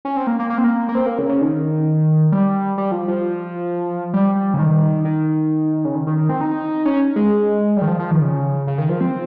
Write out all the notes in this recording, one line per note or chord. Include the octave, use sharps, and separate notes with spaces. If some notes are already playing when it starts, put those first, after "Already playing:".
C#4
C4
A#3
A#3
A#3
C4
A#3
A#3
C4
A#3
C#3
C#3
D#3
G3
G3
F3
F3
G3
G3
C#3
D#3
D#3
C#3
D#3
D#3
D#3
C4
D#4
C#4
G#3
G3
D#3
F3
F3
D#3
C#3
C#3
D#3
F3
C4